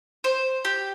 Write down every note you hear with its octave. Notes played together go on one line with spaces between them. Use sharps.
C5
G4